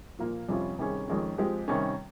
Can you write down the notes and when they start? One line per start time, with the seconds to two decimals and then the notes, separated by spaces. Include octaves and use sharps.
0.19 A#2 F3 A#3 F4
0.49 F2 C3 G3 C#4 F4
0.79 C3 D#3 G3 C#4 G#4
1.08 F2 D#3 G#3 C#4
1.38 F3 G#3 C4 G4
1.68 C3 D#3 G3 C#4